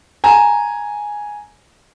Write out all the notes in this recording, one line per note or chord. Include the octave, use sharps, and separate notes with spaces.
G#5 A#5